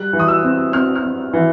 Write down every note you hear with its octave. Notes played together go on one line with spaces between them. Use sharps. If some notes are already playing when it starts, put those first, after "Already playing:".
Already playing: G3 F#6
E3
D#6
E6
C4
C4 F6
F6
C4
E3